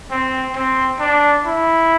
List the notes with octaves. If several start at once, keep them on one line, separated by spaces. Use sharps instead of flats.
C4
C4
D4
E4